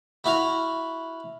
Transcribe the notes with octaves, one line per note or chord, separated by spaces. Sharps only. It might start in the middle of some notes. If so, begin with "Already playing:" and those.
E4 F#4 F5